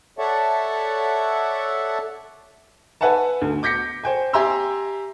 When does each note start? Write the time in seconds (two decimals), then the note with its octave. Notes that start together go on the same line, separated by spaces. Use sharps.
0.19 A4 C#5 D5 E5 F#5 A5
3.01 B4 E5 F#5 G#5 A5
3.42 D2
3.63 D6 G6 A#6 B6 C#7
4.03 C5 G5 G#5
4.33 G4 E5 G#5 A#5 C6 E6